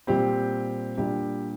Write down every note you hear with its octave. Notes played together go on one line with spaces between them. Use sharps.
A#2 G3 C4 G4
A#2 G3 D4 G4